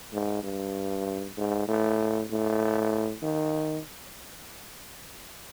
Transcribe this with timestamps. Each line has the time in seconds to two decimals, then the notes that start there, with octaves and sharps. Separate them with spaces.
0.13 G#2
0.43 G2
1.37 G#2
1.68 A2
2.31 A2
3.23 D#3